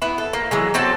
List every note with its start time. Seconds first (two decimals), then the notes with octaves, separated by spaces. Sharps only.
0.02 B3 E4
0.18 A4
0.33 A#3
0.51 E3 F#3 G#3
0.74 F#3 C4 A4 A5